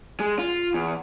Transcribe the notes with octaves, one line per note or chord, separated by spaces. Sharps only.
G#3
F4
E2